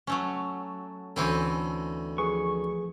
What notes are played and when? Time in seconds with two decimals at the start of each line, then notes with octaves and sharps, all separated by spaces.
0.07 F#3 A3 C#4
1.16 D2 E3 C4 C#4 E4 A4
2.18 F3 G#4 B4 C#6